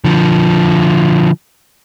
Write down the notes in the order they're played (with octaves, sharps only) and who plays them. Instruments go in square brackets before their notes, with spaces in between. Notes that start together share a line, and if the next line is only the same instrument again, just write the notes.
[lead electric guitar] D3 F3